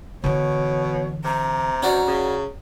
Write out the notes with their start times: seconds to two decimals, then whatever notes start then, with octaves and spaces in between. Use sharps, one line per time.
0.24 B2 D3 E3 C#5
1.24 C3 A#5
1.83 C#4 F#4 D5
2.07 C#3